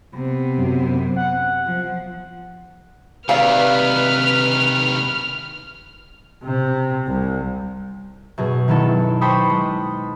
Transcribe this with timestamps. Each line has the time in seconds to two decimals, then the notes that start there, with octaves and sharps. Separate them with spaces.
0.14 C3 B3
0.57 F#2
1.16 F#5
1.66 F3
3.29 C3 D#3 B4 D5 E5 F5 F6
6.43 C3
7.06 C2
8.38 F#2 B2 G#4
8.68 D#3 F#3 B3 E4 A4
9.21 A4 C5 G5 B5 C#6 D#6
9.50 G#3